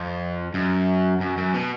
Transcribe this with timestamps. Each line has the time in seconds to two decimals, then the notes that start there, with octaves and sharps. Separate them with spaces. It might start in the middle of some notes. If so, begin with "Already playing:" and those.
Already playing: F2
0.54 F#2
1.20 F#2
1.37 F#2
1.54 B2